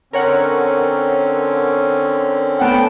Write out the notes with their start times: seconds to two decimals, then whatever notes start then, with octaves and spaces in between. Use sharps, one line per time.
0.13 D3 C4 C#4 A#4 C#5 F#5
2.60 A3 B3 F#5 G5 A5